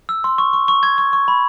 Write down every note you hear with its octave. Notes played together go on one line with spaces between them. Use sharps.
E6
C6
C#6
C#6
C#6
C#6 G#6
C#6
C#6
B5